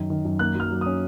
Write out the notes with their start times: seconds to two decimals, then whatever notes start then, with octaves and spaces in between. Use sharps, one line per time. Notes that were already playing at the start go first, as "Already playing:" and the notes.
Already playing: F#2 D#3
0.10 D#3
0.25 F#2
0.39 A#3 F#6
0.55 F#3
0.60 F6
0.71 F#3
0.81 D#6
0.86 C#4